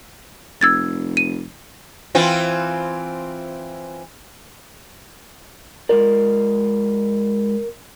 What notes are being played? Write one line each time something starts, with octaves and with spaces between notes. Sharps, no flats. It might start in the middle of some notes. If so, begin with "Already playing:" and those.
F1 E6 G#6 A6
D#7
E3 C4 F4
G#3 F4 A#4 D5